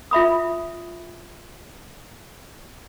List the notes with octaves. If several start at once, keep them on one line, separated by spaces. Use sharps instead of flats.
F4 E5 B5 D#6